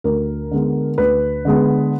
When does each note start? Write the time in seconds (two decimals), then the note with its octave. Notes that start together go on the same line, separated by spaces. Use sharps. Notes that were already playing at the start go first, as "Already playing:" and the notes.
0.04 D2 A#4
0.51 D3 G#3 B3
0.98 D2 B4
1.45 D3 G#3 B3